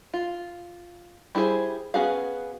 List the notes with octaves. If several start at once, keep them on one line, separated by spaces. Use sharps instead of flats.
F4
G3 E4 F#4 G#4 C5
B3 C#4 F#4 G#4 F5